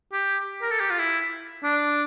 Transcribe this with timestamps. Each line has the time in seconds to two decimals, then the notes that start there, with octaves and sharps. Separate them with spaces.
0.13 G4
0.62 A#4
0.71 A4
0.81 G4
0.90 F4
0.99 E4
1.64 D4